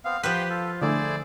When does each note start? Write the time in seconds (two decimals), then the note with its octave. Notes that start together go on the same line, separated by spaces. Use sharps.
0.05 B3 C4 F5
0.23 F3 G4 B4 F#5 G5 C6
0.50 F4 A4
0.82 D3 A3 E4 G#4 C5 D5